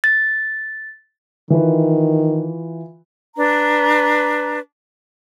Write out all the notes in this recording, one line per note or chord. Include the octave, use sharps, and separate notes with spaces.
A6
D#3 E3 F4 B4
D4 B4 A#5